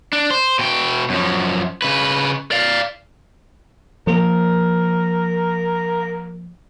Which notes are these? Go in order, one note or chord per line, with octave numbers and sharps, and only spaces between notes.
D4
C5
B2 G5
F#2 F3
C#3 B4
D5 F5
F3 A#3 A#4